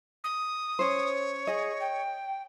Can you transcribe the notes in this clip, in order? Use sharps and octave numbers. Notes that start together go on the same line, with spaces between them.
D#6
C#4 C5 C#5
G#4 D#5
G5